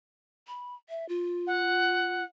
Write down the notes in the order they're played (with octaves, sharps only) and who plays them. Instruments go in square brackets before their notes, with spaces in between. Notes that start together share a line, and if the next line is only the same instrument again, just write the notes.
[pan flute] B5
E5
F4
[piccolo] F#5